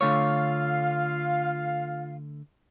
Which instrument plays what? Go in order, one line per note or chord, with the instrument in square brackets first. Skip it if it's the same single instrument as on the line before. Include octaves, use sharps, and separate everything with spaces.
[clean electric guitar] D3 A3 C#5 [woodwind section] F4 F5